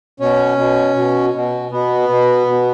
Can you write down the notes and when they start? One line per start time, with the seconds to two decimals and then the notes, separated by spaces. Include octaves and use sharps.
0.20 B2 C#4
0.58 B2
0.96 B2
1.34 B2
1.71 B2 B3
2.09 B2
2.47 B2